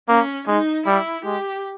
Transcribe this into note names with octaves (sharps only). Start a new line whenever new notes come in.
A#3 C#4
G#3 D#4
G3 E4
G#3 G4